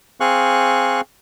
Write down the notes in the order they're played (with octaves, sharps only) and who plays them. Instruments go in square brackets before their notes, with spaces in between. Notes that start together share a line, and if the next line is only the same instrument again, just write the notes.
[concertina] C4 G#4 F5 C#6 F#6